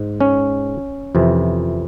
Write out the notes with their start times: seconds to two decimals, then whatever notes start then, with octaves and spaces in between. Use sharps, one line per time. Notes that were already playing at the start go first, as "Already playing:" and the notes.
Already playing: G#2
0.21 C#4
1.15 F2 C3 E3